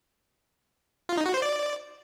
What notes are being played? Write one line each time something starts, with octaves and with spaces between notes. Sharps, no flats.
F4
D#4
F#4
C5
D5